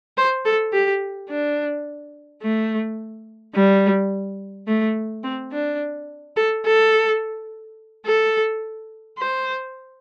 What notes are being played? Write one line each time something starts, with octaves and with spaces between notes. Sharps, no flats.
C5
A4
G4
D4
A3
G3
A3
C4
D4
A4
A4
A4
C5